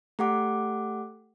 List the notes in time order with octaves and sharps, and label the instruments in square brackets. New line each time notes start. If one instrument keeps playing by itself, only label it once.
[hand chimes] A3 G4 F#5 D6